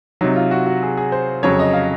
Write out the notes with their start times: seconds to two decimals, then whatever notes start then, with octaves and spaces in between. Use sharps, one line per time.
0.21 C3 F#3 D#4
0.36 F4
0.51 F#4
0.66 F#4
0.83 G#4
0.97 G#4
1.12 C5
1.43 F2 C#3 F#3 C#5
1.59 D#5
1.73 F5